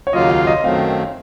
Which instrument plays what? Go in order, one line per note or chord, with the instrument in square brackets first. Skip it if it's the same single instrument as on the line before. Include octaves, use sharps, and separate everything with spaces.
[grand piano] C#5
[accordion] D#2 C#3 F#3 A#3 F4 [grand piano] D#5
[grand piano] F5
D#5
[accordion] F#2 D#3 F#3 A3 C4 [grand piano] F5